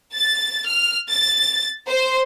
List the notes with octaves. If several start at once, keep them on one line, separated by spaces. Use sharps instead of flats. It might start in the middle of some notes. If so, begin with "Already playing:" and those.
A6
F6
A6
C5